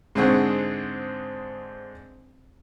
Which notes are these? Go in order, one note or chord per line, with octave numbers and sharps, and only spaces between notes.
G#2 D3 C4 G#4 F#5 C#6